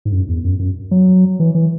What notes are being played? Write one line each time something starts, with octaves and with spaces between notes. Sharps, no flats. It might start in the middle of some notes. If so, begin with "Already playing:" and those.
G#2
F#2
E2
F#2
F#2
F#3
E3
E3